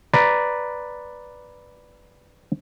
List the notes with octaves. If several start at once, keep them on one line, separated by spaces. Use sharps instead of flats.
B4 D5 A#5